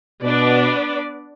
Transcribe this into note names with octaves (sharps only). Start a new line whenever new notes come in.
B2 B3 D4 B4 D5